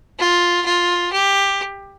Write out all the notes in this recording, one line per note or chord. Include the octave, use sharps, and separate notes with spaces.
F4
F4
G4